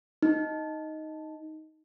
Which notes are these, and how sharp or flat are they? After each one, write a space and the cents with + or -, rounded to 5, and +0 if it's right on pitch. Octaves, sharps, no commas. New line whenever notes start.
D#4 +5